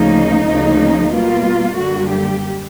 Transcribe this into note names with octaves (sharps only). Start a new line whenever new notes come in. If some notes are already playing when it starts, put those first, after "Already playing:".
Already playing: D2 C#3 F3 A#3 D#4
D2 C#3 F3 A#3
B2 G3 A#3 F4
F#2 D3 G3 A#3 F#4
G4